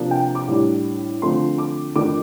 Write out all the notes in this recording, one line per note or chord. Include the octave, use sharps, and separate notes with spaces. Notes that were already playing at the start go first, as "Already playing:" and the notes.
Already playing: C3 F3 A#3 D4
G5
D6
A2 G3 D4
D3 F3 A3 C4 C6
D6
F2 D#3 A3 D4 D6